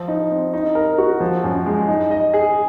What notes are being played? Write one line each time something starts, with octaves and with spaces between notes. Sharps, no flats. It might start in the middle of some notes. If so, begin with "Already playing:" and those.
Already playing: F3
D#4
C4
D#4
A#4
F#4
F3
F#2
G#3
D#4
D#5
G#4